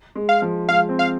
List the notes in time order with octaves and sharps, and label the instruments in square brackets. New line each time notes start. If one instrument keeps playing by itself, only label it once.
[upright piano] G#3
[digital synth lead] F5
[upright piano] F3
[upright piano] G#3 [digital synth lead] F5
[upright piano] C4
[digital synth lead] F5